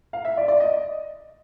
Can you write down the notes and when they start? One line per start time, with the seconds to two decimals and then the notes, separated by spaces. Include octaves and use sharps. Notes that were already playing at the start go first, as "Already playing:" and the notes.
0.13 F5
0.25 E5
0.37 D5
0.48 D5
0.60 D#5